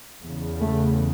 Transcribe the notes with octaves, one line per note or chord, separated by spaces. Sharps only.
E2 C#3
A3